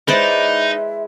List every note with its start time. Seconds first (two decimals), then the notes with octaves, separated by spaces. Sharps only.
0.08 G#3 D#4 E4 B4 C5 D5 E5